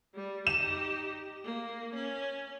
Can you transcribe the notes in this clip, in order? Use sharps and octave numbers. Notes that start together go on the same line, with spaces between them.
G3
D#4 G4 E7
A#3
C#4